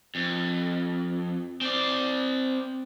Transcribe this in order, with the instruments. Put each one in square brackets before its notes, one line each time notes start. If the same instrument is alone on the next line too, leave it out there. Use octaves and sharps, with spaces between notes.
[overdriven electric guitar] F2
C4 D5